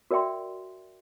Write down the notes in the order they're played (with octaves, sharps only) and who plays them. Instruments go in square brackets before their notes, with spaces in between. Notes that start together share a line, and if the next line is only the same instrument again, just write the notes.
[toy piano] F#4 A#4 D5 E5 G5 C6